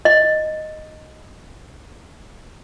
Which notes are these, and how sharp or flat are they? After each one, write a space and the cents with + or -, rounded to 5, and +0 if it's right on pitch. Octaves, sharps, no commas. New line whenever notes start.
D#5 +0